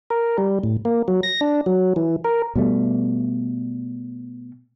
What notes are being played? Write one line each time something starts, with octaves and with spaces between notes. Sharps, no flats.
A#4
G3
A2
A#3
F#3
A#6
D4
F#3
E3
A#4
B2 G3 A3